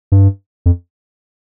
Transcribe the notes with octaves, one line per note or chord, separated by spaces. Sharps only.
G2
F2